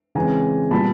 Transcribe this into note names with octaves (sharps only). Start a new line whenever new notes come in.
C#3 E3 G#3 C4 G#5 A#5
A#2 G3 B3 A5 B5